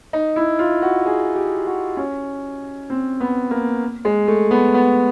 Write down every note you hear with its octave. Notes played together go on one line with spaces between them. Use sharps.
D#4
E4
F4
F#4
G#4
G4
F#4
C#4
C4
B3
A#3
G#3
A3
B3
B3